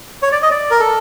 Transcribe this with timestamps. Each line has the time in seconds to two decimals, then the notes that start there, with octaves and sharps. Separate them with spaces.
0.22 C#5
0.32 D5
0.43 D#5
0.51 D5
0.71 A#4
0.80 A4